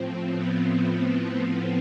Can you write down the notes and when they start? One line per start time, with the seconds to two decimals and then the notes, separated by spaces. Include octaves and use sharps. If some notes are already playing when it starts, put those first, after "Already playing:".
Already playing: A2 F3 C4
0.28 B3